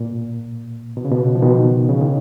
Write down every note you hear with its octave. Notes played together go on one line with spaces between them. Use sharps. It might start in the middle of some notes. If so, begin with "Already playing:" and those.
Already playing: A#2
B2
C#3
B2
F3
B2 D#3
C#3
D#3